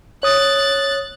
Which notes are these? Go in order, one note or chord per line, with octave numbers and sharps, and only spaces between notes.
C#5 D#6 F#6 A6